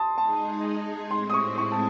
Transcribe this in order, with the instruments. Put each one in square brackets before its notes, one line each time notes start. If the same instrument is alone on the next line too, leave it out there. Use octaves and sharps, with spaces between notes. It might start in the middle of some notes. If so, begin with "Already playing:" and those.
Already playing: [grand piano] A5 C6 D#6
[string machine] G#3 D#4 G#4 [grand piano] A5
[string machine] A2 G#3 C4 E4 [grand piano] C6
[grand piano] D#6
C#6
C#6
A5